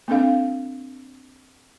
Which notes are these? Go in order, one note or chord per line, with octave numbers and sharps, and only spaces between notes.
A#3 C4 D4 A4 F5